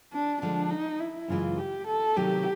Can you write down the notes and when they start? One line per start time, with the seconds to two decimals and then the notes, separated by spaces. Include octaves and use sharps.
0.13 D4
0.41 D3 F3 G#3 D4
0.70 D#4
0.99 E4
1.28 F#2 C#3 E3 G#3 F4
1.58 G4
1.87 A4
2.16 C3 D#3 F#3 A3 G4